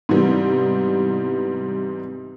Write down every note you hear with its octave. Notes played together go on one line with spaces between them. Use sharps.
G#2 C3 E3 G3 B3